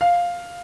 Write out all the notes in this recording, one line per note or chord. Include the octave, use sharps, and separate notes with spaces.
F5